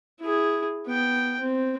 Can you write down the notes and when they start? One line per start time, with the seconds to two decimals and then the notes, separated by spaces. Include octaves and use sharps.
0.20 E4 G#4
0.86 B3 G5
1.40 C4